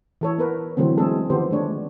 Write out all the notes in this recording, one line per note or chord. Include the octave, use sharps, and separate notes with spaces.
E3 A4 C#5
B3 A#4 B4
D3 E3 F#3 A3 C4
E3 G#3 C4 D4 G#4 A4
D3 D#3 F3 B3 G4 C5
G#3 A3 D4 C#5